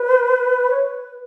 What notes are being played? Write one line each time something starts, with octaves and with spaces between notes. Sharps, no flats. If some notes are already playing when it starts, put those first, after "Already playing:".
Already playing: B4
C#5
B4